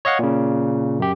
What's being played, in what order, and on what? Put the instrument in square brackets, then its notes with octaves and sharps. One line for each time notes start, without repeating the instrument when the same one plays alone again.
[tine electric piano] C#5 D#5 F5 F#5
A#2 C#3
F#2 G4